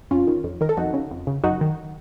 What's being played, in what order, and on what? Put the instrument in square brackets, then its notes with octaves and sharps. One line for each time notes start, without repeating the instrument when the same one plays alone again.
[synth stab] F2 C#4 F4
D#3
F2
D#3 A#4
A4
F2 D#4 F#4
C#3
F2
C#3
F#2 D#4 F#4
D#3